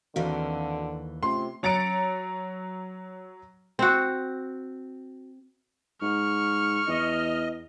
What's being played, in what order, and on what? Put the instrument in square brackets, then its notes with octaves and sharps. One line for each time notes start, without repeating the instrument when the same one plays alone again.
[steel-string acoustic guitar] D#2 E3 [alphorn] D3 [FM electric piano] C4 F#4 F5
[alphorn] C3 [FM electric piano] A3 C#4 F4 [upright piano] C6
[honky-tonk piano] F#3 A#5 A6 C#7 D7
[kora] C4 F#4
[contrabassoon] G#2 [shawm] C#6 [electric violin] F6
[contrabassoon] E2 [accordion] D#5